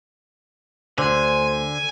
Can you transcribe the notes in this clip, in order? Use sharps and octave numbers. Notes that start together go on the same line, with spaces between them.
D2 D3 C5 G#5